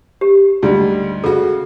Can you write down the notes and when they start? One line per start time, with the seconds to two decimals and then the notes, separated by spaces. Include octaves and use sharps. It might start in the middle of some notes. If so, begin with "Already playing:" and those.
0.21 G4
0.63 D2 G#2 G3
1.24 C#3 F#4 A4